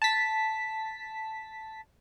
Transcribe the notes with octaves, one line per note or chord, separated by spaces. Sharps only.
A5 B6